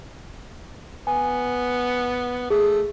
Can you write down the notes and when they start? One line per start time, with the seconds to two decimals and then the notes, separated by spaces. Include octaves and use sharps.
1.07 B3 G#5
2.50 A3 G#4